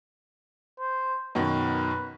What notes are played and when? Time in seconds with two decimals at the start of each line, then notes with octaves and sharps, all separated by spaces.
0.80 C5
1.35 F#2 B2 D#3 B4